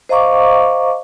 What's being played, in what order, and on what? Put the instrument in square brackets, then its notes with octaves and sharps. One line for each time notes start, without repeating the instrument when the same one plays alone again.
[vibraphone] C5 D#5 F5 A#5 C#6 D6